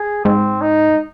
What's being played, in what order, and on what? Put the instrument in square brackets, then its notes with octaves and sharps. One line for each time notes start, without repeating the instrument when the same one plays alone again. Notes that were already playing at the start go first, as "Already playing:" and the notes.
Already playing: [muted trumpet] G#4
[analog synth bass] G#2 [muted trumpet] C4
[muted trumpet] D#4